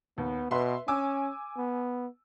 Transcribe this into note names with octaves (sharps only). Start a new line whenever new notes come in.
D#2 B3
B2 B4 E5 C6
C#4 G#5 D6 E6
B3